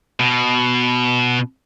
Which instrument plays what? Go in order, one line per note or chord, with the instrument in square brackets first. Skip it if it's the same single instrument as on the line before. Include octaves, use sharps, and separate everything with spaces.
[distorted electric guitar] B2